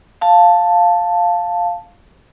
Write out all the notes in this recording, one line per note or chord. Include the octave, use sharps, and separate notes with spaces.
F5 A5